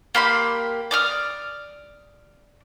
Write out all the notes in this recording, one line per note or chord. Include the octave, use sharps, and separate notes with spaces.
A#3 G4 B5 C6
D5 D#6 F6